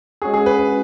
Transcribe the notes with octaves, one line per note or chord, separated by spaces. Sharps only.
G#3 C#4 F#4 G#4
G#4
B4